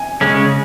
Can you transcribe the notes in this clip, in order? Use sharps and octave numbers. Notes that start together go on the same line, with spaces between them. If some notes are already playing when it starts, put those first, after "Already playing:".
Already playing: G#5
C#3 G#3 C#4 G#5